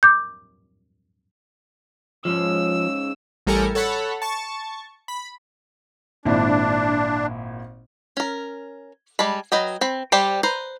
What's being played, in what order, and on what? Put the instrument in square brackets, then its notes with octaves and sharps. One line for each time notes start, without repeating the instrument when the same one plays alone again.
[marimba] D6 G6
[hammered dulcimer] G#2 C#3 [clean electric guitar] F3 [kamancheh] E6
[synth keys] A1 G3 A4 A#4 G#5 C#7
A4 C#5 F#5 B5 C#6
A5 C#6
B5
[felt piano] G#1 A#2 E4 [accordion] D4
[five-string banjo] C#4 A#4
G3 G#3 A5 B5
F#3 B4 D#5 G5
C4 B5
G3 G4 C5 D5 G5
B4 C5 A#5